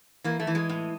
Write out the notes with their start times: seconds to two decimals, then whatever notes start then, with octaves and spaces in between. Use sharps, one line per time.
0.24 E3 A#3
0.40 A3
0.47 E3
0.55 G#3
0.69 A2